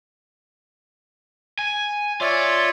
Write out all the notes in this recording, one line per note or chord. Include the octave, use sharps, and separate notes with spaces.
G#5
F4 C#5 D5 E5